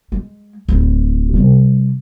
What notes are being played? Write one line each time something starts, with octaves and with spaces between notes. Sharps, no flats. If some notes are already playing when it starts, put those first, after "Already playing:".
G#3
D1 E4
C3 G3